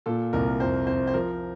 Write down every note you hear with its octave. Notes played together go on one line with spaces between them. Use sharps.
A#2 A4
C2 A#4
F2 C5
F2 C5
C5
F3 A#4